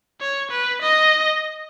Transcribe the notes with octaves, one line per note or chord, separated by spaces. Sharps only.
C#5
B4
D#5